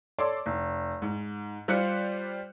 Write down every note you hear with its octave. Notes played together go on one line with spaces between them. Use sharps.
A4 C#5 D5 C6 D6
F1
G#2
G3 F4 C5 D5 F#6 C#7